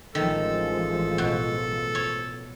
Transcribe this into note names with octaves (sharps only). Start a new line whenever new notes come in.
A1 D#3 F3 G#3 A4
B2
C#5